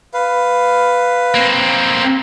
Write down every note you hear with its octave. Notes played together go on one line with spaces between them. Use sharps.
B4 F5
A#3 C4